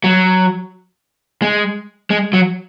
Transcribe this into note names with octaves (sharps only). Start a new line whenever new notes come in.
F#3
G#3
G#3
F#3